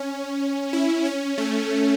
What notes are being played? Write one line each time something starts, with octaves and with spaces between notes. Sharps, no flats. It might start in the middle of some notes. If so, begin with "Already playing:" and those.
Already playing: C#4
E4
C#4
A3